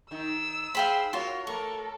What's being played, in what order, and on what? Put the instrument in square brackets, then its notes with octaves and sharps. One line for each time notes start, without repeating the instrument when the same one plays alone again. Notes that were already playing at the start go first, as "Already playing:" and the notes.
[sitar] D#3 D#4 [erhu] E6
[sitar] G#4 C5 [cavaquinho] F5 G5 B5
[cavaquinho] F4 C6 [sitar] F#4 A#4 C#5
[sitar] A3 A#4 [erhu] A4 [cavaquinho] C#6